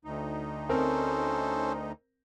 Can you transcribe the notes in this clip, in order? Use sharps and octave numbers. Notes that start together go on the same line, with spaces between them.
D2 D#4
C4 C#4 A4 A#4 C5